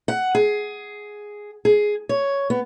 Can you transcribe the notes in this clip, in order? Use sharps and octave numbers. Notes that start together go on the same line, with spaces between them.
F#5
G#4
G#4
C#5
B3